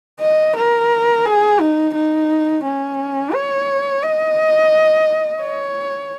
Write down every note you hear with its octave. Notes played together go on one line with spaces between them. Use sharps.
D#5
A#4
G#4
D#4
D#4
C#4
C#5
D#5
C#5